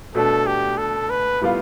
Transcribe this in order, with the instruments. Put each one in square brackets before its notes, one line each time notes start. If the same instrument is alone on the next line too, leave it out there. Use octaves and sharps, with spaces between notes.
[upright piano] B2 A3 D4 [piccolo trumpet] A4
[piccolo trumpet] G4
A4
B4
[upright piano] A2 G3 B3 F4